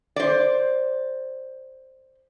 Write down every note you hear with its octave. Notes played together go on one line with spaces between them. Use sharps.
C5 D5